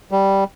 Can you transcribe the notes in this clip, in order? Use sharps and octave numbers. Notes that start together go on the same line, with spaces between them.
G3